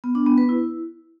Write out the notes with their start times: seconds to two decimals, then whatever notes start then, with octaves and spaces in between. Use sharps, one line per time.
0.04 B3
0.15 D4
0.26 B3
0.38 B4
0.49 E4